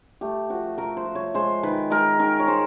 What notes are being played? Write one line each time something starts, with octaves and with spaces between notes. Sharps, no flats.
A3 G4
F3 F#4
A3 A#4
C5
F3
C#5
G#3 C5
D#3 B4
G#3 A#4
D#3 A#4
C#5
G#3 C5